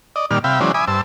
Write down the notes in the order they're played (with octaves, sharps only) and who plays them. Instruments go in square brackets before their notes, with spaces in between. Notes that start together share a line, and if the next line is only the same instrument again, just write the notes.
[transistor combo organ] D5 D#5
A#2 D#3 G3 D5 F6
C3 E5 F5 G5 B5
E3 F#3 G#3 C#4 C5 D5
E5 G#5 B5 D6 D#6
G2 C5 A5 E6